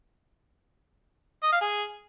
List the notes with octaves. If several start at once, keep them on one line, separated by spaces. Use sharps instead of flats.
D#5
F5
G#4